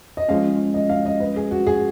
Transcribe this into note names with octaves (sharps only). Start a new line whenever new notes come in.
D#5
F3 G#3 C#4 F5
D#5
F5
D#5
B4
G#4
F#4
G#4